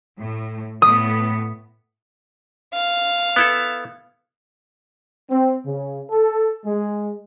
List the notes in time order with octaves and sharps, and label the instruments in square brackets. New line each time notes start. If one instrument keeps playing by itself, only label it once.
[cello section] A2
[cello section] A2 B3 [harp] D#6
[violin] F5
[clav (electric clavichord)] B3 E4 A4
[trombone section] C4
C#3
A4
G#3